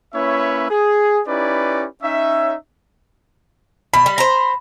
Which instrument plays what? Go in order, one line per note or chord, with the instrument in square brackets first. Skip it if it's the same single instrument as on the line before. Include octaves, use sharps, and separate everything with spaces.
[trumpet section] A#3 C#4 E4 B4 C#5 E5
G#4
C#4 D#4 E4 G4 B4 D5
C#4 D#4 C#5 E5
[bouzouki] B2 [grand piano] B5
[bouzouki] G3
C5 A#5